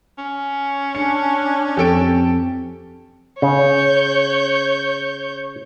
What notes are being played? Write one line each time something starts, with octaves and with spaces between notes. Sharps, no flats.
C#4
D4 C#7
F2 G4 A4 D7
C#3 C#5 G6